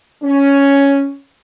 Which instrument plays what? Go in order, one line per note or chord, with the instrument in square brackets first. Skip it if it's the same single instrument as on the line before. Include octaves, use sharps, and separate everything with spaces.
[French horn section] C#4